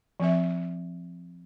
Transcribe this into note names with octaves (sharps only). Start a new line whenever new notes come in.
F3 C4 E5